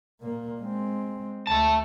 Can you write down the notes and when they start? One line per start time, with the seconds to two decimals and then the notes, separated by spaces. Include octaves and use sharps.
0.21 A#2 A#3
0.60 G#3 C4
1.47 D2 A3 A5